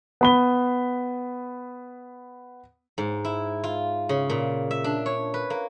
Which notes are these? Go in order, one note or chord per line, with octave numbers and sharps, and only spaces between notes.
B3 B5 G7
G#2
E4
F4
C#3
A#2
E5
D4
C#5
B4
A#3